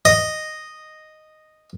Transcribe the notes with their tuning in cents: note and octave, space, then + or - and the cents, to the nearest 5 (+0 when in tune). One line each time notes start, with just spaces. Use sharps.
D#5 -5